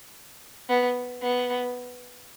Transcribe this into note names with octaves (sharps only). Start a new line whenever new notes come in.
B3
B3